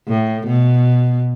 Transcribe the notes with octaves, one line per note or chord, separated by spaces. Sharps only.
A2
B2